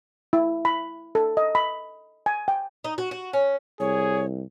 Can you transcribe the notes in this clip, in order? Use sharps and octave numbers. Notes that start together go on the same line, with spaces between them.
E4
B5
A4
D#5
B5
G#5
G5
D#4
F#4
F#4
C#4
C2 G#4 C#5